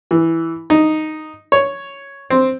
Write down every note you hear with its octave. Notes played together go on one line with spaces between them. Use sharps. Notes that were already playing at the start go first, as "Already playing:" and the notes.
E3
D#4
C#5
C4